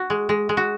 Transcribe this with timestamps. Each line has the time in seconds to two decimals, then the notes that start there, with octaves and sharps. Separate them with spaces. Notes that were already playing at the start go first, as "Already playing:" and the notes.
Already playing: F#4
0.10 G#3
0.29 G#3
0.49 G#3
0.57 F#4